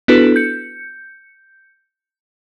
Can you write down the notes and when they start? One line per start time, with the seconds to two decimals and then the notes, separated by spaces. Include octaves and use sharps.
0.08 B3 D4 E4 F#4 A4 B4
0.36 G6 C#7